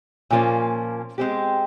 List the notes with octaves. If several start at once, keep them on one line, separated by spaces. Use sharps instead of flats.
A#2 F3 A#3 C#4
G#3 C4 G4